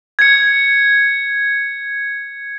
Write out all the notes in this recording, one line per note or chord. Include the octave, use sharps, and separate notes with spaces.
G#6 C#7